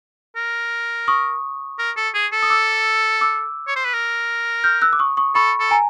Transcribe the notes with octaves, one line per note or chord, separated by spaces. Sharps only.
A#4
C#6 D#6
A#4
A4
G#4
A4
D#6
D6 E6
D6 E6
C#5
C5
B4
A#4
F6 G6
E6 F#6
D6
C#6 D#6
C#6 D#6
A4 B5 C#6
A4
G#5 A#5